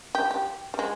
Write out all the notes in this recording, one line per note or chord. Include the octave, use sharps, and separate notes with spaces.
G4
G4
G3
G#3